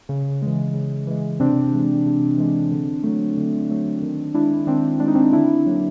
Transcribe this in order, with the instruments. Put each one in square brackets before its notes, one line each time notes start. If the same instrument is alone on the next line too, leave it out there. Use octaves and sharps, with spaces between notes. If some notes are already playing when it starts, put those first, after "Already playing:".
[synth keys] C#3
E3 G#3
C#3
E3 G#3
C3 C4 D4
E3 G#3
C3
E3 G#3
D3
F#3 A3
D3
F#3 A3
D#3
G#3 D4 E4
D#3 C4 D4
G#3 D4
D#4
C4 D4
D3 D4 E4
F#3 A#3